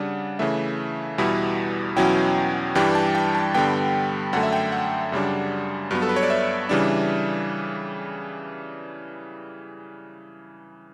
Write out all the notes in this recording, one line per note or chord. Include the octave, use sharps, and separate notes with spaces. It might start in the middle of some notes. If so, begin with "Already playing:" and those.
Already playing: C#3 G3 D4 F#5
C#3 E3 A3 E5
E2 B2 G3 B3 E4
E2 B2 F#3 C#4 E4 G5
G2 E3 G3 D4 G5
A5
G5
A5
G2 D3 G3 B3 G5
F#2 D3 A3 F#5
E5
G5
F#5
F#2 C#3 G3 D4
G2 F#3 B3
A4
B4
C#5
D5
E5
C#3 E3 G3 D4